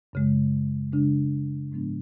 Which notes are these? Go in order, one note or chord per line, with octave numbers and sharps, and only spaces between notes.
F#2 C#3 G#3
C#3 G#3 D4
G#2 F3 G#3 B3 D4